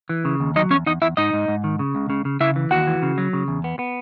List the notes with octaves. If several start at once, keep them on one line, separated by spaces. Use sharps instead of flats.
E3
C#3
D#2
F#3 D#4 D#5
E2 C#4 C#5
E2 D#4 D#5
E2 E4 E5
G#2 D#4 D#5
G#2
G#2
D#3
C#3
C#2
C#3
C#3
C#3 E4 E5
E3
D#2 F#4 F#5
E3
C#3
F#3
C#3
E2
B3
B3